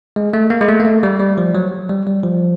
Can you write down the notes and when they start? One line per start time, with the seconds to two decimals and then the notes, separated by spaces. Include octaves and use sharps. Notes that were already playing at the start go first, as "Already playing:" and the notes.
0.16 G#3
0.33 A3
0.50 A#3
0.61 G#3
0.68 A3
0.80 A#3
0.85 A3
1.03 G3
1.19 G3
1.38 F3
1.55 F#3
1.89 G3
2.07 G3
2.24 F3